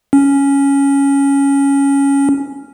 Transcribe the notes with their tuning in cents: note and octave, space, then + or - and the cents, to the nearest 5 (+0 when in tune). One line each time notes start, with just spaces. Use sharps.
C#4 +5